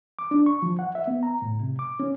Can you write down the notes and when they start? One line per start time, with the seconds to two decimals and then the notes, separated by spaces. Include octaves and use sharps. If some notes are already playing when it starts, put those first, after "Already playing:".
0.19 D6
0.31 D4
0.46 C#6
0.62 F3
0.79 F#5
0.95 E5
1.07 B3
1.23 A#5
1.42 A2
1.60 C3
1.79 D6
2.00 C#4